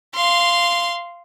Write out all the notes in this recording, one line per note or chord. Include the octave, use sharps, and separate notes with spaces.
F5 C6